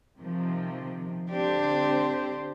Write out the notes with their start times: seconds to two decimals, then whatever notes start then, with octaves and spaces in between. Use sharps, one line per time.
0.19 C3 D#3 F3
1.30 D3 C4 D4 G4 C5